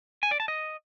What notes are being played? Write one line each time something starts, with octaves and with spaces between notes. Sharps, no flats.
G#5
D5
A5
D#5